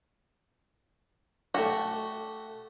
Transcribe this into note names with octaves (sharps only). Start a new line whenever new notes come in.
A3 F#4 G4